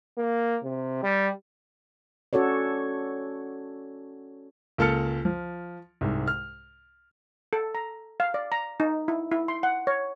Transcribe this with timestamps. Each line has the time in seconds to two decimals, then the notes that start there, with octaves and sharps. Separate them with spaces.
0.18 A#3
0.64 C3
1.03 G3
2.33 C#4 F#4 A4 C#5 D5
4.78 C#2 A#3 A4 A5 F6 C#7
5.25 F3
6.01 C2 G#2
6.28 F6
7.53 A4
7.75 A#5
8.20 F5
8.34 D5
8.52 A#5
8.80 D#4
9.08 E4
9.31 E4
9.48 C6
9.63 F#5
9.87 C#5